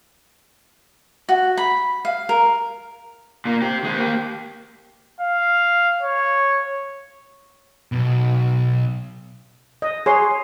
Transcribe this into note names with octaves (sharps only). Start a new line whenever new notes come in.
F#4
B5
F5
A#4
A#2 A#3
C4 G4
G#3 C4
A#3 G4
F5
C#5
B1 B2
D#5
G#4 C#5 C6